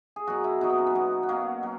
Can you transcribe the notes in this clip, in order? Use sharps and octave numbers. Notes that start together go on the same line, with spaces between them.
G#4
B2 F#3 F#4
E4
B2 F#3 D#4
B3
C#4
B3
B2 F#3
B3
B2 F#3 A#3
F#3